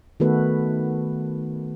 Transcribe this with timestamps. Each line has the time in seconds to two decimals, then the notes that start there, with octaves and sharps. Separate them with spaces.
0.20 D#3 A3 B3 F#4 A4 B4